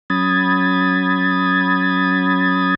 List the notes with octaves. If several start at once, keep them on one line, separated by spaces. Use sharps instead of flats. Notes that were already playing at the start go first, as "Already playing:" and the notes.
F#3 C#4 B5 D#6 G#6 A6